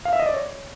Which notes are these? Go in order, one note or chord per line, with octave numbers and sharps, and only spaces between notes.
F5
E5
D#5
D5
C#5